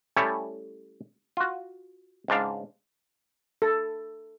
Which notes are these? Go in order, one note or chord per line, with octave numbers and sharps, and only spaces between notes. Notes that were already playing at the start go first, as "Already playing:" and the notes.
G3 A3 C#4 E4 A4 C#5
F4 F#4
C#2 G#2 D4 F5
A4